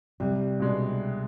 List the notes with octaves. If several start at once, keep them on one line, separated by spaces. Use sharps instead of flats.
C2 G3
B2 G#3 D4